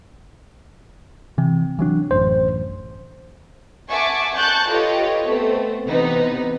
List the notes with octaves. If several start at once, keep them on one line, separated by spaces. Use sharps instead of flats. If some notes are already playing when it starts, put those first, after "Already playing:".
C3 E3
E3 F#3 D4
A1 F#2 C5
E5 F#5 G#5 A5 C#6 D6
A5 C#6 F#6 G6 A6
F4 G4 A4 B4 C#5 D#5
A3 B3 C4
C3 E3 B3 D#4 B4